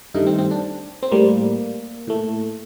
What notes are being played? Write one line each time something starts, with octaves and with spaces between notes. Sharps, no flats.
G2 D#3 A3 D#4
C4
C4
D4
C4
A2 G3 A#3
A2 A3